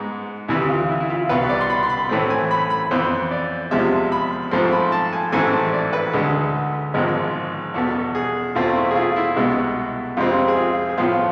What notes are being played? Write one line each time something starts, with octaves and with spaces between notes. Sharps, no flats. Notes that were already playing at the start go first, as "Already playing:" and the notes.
Already playing: G#2 G#3 B3
D2 C3 E3 E4
F4
E4
E4
F4
C2 B2 B3 B4
D5
C6
B5
C6
B5
A2 E3 A3 C4
G#5
B5
B5
F2 E3 B3 C5
D5
E2 C3 F3 G#3 E5
B5
G#2 F3 A3 C4 C6
B5
A5
G#5
A1 G#2 E3 A3 C4 G#5
A5
D5
B4
D2 D3 G#3
G#1 G#2 F3 G#3 B3
E2 B2 B3 A4
G#4
E2 B2 A3 C4 F4
E4
G#4
F4
E4
C2 B2 G#3 B3
F2 C3 G#3 C4 F4
G#4
F4
G#4
A2 F3 B3 F4